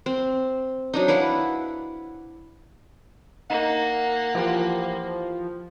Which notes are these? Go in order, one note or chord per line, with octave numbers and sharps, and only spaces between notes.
C4
F#3 D4 D#4
E4 B4 F5 F#5
A#3 D#4 F#5
E3 F3 G4